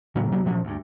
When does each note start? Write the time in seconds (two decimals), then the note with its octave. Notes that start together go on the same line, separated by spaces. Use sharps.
0.15 A2 C#3 F#3 A#3
0.31 C3 F#3 A#3 B3
0.46 A#2 E3 F3 C#4
0.64 D2 G2